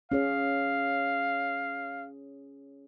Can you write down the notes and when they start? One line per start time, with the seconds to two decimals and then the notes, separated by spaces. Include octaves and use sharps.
0.12 C#4 G#4 C#5 F5